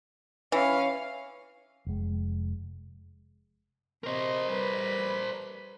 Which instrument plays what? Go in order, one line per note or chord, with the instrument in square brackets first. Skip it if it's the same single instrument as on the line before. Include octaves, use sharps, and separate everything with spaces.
[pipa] E3 [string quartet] C#4 F5
[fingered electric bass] F1 G#3
[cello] C3 D#5 [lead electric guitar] A#4 C5
[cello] G3 B4